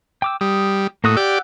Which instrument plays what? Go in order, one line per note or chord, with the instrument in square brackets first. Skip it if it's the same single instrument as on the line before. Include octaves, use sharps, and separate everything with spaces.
[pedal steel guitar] G5 D6 E6
[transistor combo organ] G3 [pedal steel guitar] D#6
[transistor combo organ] A2 [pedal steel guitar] A#3 F#4 D#6
[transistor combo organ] G4 D5 [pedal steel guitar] F#5 E6